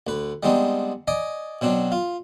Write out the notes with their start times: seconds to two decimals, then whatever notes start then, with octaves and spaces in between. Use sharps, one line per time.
0.07 D2 B4
0.43 G3 G#3 B3 C4 D4 D#4
1.08 D5 D#5 G#5 D6
1.61 B2 F#3 C4 D4
1.92 F4